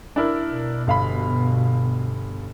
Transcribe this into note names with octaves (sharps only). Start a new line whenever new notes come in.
D4 E4 A#4
B2
G1 F5 B5